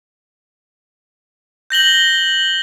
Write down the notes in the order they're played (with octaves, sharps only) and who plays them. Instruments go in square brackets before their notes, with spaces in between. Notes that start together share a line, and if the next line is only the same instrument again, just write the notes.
[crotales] G6 A#6 F#7 G7